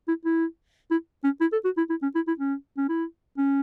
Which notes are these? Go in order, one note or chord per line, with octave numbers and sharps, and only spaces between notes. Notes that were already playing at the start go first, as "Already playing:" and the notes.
E4
E4
E4
C#4
E4
A4
F#4
E4
E4
C#4
E4
E4
C#4
C#4
E4
C#4